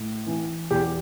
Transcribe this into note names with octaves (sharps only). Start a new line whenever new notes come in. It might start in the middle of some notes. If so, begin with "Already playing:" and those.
Already playing: A2
E3
E2 G4